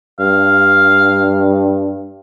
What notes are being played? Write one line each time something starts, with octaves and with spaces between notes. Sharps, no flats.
G2 F5